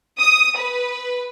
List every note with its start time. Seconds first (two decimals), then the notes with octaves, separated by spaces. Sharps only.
0.19 D#6
0.56 B4